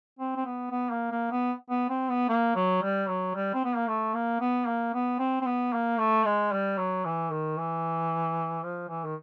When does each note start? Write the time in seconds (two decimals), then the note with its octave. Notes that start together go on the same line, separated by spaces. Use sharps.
0.19 C4
0.36 C4
0.45 B3
0.71 B3
0.91 A#3
1.11 A#3
1.31 B3
1.70 B3
1.90 C4
2.10 B3
2.29 A#3
2.55 F#3
2.82 G3
3.09 F#3
3.35 G3
3.54 C4
3.65 B3
3.76 A#3
3.88 A3
4.14 A#3
4.40 B3
4.67 A#3
4.94 B3
5.19 C4
5.41 C4
5.46 B3
5.73 A#3
5.99 A3
6.25 G#3
6.52 G3
6.78 F#3
7.05 E3
7.31 D#3
7.58 E3
8.63 F3
8.89 E3
9.05 D#3